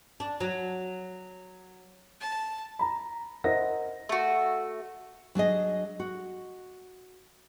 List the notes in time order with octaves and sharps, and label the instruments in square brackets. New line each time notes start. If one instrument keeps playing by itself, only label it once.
[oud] D4
F#3
[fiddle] A5
[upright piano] A#5 B5
A#4 C5 D#5 E5 F#5 A#6
[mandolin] A3 F#4
[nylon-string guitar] F#3 D4 G#4 D#5
F#4